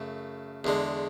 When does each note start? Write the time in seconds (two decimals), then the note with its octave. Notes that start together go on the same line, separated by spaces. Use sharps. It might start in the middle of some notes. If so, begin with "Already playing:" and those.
Already playing: F#2 C#3 A3
0.64 E2 D3 G#3